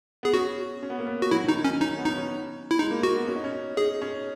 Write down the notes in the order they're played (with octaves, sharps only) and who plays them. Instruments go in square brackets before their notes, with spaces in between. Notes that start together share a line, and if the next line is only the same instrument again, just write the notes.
[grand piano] B3 [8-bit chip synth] G#4
[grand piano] C#4 [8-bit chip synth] F#4
[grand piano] C#4
B3
A#3
B3
[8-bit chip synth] F#4
[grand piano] F#3 [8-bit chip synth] E4
[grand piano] D#3
[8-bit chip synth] D#4
[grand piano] D#3
[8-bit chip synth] C#4
[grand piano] C#4 [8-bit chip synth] D#4
[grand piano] B3
[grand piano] C#4 [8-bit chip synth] D#4
[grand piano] C#4
[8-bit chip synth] E4
[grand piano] G#3 [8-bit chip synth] D#4
[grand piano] A#3
[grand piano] A#3 [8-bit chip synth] F#4
[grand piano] B3
C#4
D#4
C#4
[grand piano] D#4 [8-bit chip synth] G#4
[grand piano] C#4